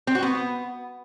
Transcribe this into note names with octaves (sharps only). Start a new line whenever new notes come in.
C4
F#4
B3